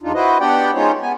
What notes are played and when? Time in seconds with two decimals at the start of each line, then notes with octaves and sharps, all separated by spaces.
0.02 E2 D4 D#4 F4
0.14 E4 F#4 B4 C5 D#5
0.40 B3 D4 G4 D5 F#5 G5
0.74 G#3 C#4 D#4 F4 C5 C#5
1.02 B3 G#5